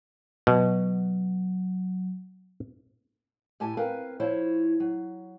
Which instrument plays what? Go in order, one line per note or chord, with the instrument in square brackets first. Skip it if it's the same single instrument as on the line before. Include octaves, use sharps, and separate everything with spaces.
[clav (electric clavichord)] B2 [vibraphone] F#3
[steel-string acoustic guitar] A2 G4 G#5 A5
C4 A#4 B4 F5 G#5
F3 E4 C5 C#5
F#3